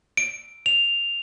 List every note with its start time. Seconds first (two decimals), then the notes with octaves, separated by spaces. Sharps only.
0.17 D7
0.66 F7